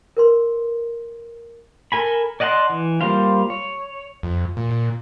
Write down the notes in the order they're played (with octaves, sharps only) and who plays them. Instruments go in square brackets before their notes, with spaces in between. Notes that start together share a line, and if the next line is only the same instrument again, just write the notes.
[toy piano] A#4 B4 C6
[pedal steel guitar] A4 A#4 G#5 B5
D5 D#5 F#5 A5 C6
E3
G3 A#3 F4 C5 F5
C#5
[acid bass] F2
A#2
A#2